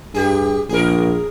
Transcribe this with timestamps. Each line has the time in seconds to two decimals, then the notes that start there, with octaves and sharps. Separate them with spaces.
0.14 G2 G4 G#4
0.69 A#1 G#4 A#4